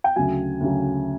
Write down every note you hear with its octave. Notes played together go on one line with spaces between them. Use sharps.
G5
D2 C#3 F#3 G#5
D2 C#3 F#3